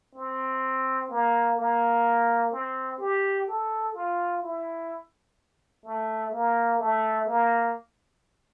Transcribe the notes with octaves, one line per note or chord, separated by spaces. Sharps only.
C4
A#3
A#3
C4
G4
A4
F4
E4
A3
A#3
A3
A#3